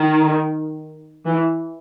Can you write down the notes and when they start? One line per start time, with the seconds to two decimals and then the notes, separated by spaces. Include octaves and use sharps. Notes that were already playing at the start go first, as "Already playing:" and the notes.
Already playing: D#3
1.25 E3